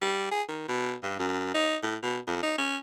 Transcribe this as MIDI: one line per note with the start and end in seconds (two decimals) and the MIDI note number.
0.01 0.30 55
0.31 0.42 68
0.48 0.64 51
0.68 0.94 47
1.03 1.16 43
1.19 1.54 42
1.54 1.77 63
1.83 1.96 45
2.02 2.18 47
2.27 2.41 41
2.43 2.56 63
2.58 2.77 61